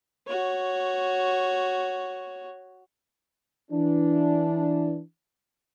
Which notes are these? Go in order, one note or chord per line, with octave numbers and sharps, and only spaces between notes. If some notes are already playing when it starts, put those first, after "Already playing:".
F#4 C#5
E3 D4